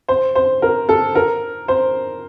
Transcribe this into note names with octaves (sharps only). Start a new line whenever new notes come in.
C5
C5
A#4
A4
A#4
C5